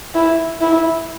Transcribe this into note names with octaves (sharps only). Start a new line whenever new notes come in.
E4
E4